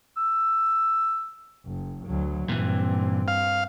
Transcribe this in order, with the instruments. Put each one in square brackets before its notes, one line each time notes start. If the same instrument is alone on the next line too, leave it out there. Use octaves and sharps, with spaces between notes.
[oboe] E6
[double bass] F#1
D2 F#3
[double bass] G2 C4 [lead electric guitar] A#2 E3
[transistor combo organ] F5